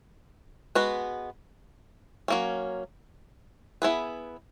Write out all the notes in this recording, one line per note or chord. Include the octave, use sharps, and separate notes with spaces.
G#3 B3 F#4 B4
F#3 A#3 C#4
B3 E4 G#4 B4